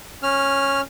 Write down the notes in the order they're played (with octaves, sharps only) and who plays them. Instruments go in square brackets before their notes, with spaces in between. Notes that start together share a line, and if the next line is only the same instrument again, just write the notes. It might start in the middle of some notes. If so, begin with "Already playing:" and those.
[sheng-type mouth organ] C#4 F6